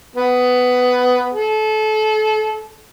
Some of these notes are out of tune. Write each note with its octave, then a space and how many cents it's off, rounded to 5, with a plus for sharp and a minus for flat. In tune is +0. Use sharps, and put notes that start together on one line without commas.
B3 +15
A4 -30